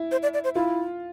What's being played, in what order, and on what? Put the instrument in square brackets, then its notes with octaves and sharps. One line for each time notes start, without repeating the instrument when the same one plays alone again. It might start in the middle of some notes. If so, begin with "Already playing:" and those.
Already playing: [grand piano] E4
[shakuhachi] C5
D5
D5
C5
[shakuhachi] E4 [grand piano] F4